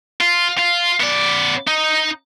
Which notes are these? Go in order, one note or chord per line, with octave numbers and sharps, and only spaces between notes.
F4
F4
B3 D5
D#4